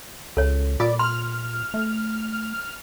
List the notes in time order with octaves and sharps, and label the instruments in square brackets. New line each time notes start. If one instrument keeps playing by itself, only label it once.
[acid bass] C#2 [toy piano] A4 C#5
[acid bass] A#2 [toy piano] F4 D#6 [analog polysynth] D5
[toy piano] C6 [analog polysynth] F6
[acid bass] A3